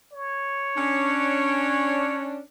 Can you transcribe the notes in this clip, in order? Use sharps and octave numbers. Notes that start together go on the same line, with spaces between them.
C#5
C#4 D4